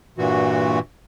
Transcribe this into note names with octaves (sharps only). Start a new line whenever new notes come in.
G2 A#2 E3 F#4